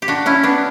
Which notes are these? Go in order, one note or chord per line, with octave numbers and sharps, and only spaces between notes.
G4
D4 F#4
C#4 E4
B3 D4